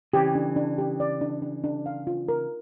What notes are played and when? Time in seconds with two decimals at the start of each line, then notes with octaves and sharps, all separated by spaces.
0.13 C#3 E3 G4
0.35 D4
0.56 D4
0.78 G4
1.00 D5
1.21 D4
1.42 D4
1.64 D4
1.86 F5
2.07 F4
2.28 A#4